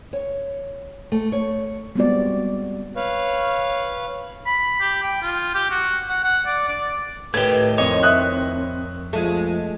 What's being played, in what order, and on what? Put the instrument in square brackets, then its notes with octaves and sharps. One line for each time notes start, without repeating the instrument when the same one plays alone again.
[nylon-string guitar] C#5
A3
C#5
[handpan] G3 G#3 B3 C4 F#4 D5
[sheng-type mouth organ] B4 C#5 F5
[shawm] B5
G4
G5
F4
G4
F#4
F#5
F#5
D5
D5
[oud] A2 D#3 [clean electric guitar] A3 G4 [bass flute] B4 [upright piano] G#6
[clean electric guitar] F2 C#5 [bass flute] C4 [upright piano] D#5
[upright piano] E5 D#6 F#6
[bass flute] F3 [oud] G#3 A3